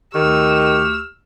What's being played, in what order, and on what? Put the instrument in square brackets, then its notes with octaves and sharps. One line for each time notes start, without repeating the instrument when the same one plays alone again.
[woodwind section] D2 C#6 F6 [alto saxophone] D#3 [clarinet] G4 [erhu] E6